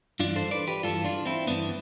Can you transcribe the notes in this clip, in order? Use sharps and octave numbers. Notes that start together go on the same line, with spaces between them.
G2 E3 D4 F4
A4 C5
B4 D5
G4 B4
G2 E3 F4 A4
D4 F4
C4 E4
G2 E3 B3 D4